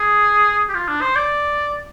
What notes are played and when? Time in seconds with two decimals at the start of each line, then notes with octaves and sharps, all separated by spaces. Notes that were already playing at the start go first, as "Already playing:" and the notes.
Already playing: G#4
0.69 G4
0.74 F4
0.88 D4
1.01 C5
1.16 D5